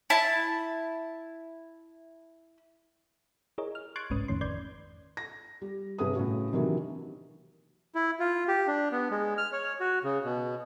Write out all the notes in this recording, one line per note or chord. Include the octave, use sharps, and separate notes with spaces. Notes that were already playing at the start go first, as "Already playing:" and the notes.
E4 A5
E4 G#4 A#4 C#5 D#5
F6
C6 C#6 F#6 G#6 A6 D7
G1 C2 G#2 C#4 B4 D#6
A1 F2 A2 D#3 C#4 C6
B4 D5 C6 G6 G#6
A#6
G3
G1 C3 G#4 B4 D#6
A2 C#3 F#4
C3 D#3 E3 F#3 A#3 D4
E4
F4
G4
D4
B3
G#3
F6
C#5
F#4
C#3
B2